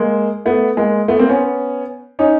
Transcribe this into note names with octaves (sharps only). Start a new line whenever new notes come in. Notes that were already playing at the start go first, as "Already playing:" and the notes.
Already playing: G#3 A#3
A3 B3
G#3 A#3
A3 B3
A#3 C4
B3 C#4
C#4 D#4